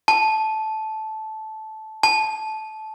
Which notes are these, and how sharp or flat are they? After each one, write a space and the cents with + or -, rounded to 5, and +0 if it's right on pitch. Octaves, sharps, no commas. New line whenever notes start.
A5 -15
A5 -20